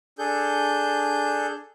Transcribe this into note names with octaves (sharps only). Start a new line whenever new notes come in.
D4 G#4 A4 G6